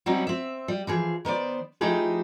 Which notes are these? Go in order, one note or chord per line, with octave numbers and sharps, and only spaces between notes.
F#3 G3 C4 C#4 D#4 E4
C4 E5
G3
E3 F3 G#4
D#3 B3 C5 D5
F3 A3 D#4 E4 G4 G#4